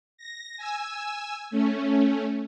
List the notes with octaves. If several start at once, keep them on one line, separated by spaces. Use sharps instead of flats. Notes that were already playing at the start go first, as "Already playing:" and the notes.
A#6
G#5 E6
A3 C#4